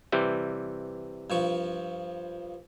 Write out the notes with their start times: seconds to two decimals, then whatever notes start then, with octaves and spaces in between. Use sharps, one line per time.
0.12 C3 E3 G3
1.30 G2 F3 C#6